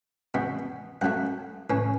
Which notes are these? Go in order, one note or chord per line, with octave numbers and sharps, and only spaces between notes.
E2 B2 B3
F#2 F#3 A3 F#5
A2 E3 C#4